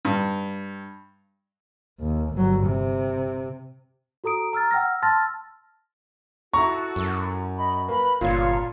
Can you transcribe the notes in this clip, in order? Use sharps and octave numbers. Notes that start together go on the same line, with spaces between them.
G2
D#2
G1 F#3
C3
F#4 A4 A#5 D#6 D7
A#5 E6 F6 A6
F#5 G5 E6 F6 A#6
A5 C6 E6 F6 A6 A#6
E4 F#4 A4 A#5 C#6
F#2
D#5 B5
A#3 B4 B5
G1 A#2 F4 C#5 F5